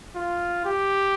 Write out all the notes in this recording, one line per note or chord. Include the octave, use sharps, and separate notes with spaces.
F4
G4